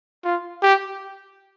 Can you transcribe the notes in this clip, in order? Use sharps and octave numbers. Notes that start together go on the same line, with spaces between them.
F4
G4